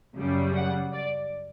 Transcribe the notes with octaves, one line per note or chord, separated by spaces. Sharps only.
F#2 C#3 G3
F#5
D5